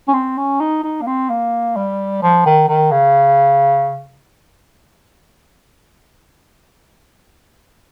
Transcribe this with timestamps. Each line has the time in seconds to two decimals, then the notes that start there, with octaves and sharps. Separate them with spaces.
0.08 C#4
0.13 C4
0.37 C#4
0.60 D#4
0.83 D#4
1.01 A#3
1.07 C4
1.29 A#3
1.76 G3
2.22 F3
2.45 D#3
2.68 D#3
2.91 C#3